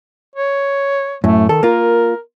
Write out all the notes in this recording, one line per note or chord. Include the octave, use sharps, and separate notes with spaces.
C#5
F#2 A2 A3
D#3 A4
A#3 F4 A#4